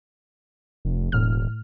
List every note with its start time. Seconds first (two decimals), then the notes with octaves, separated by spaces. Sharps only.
0.85 F1
1.12 E1 A2 F6